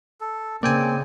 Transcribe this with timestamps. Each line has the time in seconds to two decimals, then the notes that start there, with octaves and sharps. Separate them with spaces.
0.21 A4
0.63 C#3 A#3 C4 D5 G5 G#5